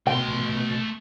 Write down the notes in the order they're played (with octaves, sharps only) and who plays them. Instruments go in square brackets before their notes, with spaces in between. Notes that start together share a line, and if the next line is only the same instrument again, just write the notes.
[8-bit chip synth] B2 [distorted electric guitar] A3 C6 [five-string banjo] G5